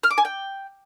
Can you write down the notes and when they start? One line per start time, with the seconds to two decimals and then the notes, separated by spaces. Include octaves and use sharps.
0.03 F6
0.11 D6
0.18 G#5
0.25 G5